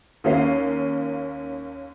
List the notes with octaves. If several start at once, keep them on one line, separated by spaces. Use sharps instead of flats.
D#2 A#3 C#4 F5 C7